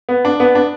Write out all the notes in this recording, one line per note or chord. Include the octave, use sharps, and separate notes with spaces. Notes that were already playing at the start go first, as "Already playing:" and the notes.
B3
D4
B3
D4